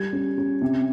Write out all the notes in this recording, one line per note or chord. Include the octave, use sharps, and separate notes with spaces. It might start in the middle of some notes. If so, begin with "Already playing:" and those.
Already playing: G3 G#6
C#4
C#4
C3